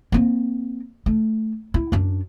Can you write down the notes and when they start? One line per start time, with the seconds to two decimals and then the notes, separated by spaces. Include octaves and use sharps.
0.12 A#3 C4
1.06 A3
1.74 E4
1.92 F#2 D4